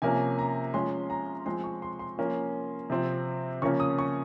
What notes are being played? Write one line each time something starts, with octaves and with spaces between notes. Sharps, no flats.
C3 F3 A#3 C#4 G#5
A#5
F3 G#3 C#4 C6
A#5
F3 G#3 C4 C6
C#6
C6
C6
F3 A#3 C#4
C3 F3 C4
C#3 F3 A#3 C#4 C#6
D#6
C#6